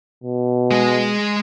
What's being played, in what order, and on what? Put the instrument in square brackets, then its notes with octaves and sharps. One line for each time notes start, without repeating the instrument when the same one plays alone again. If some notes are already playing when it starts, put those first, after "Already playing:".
[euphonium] B2
[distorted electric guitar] G#3 D#5